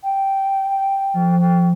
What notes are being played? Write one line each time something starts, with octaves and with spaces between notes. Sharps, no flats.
G5
F3
G5